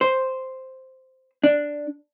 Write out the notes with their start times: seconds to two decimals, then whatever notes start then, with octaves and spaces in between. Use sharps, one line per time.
0.01 C5
1.43 D4